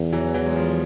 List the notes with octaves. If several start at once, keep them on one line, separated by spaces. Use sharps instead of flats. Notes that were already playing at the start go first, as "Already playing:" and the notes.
Already playing: E2
E3 F#3
E3 F#3
G#3
F3 G3